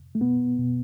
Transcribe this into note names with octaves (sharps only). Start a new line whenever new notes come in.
A3
B2 B3
B2